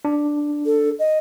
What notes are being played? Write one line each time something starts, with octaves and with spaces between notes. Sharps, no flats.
D4
A4
D#5